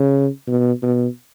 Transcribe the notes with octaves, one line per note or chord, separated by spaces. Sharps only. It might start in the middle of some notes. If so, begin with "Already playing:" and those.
Already playing: C#3
B2
B2